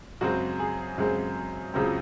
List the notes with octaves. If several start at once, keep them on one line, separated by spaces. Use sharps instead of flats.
F#2 C#3 G#3 C4 F#4
G#4
F#2 C#3 G#3 C4
C#2 C#3 F#3 C4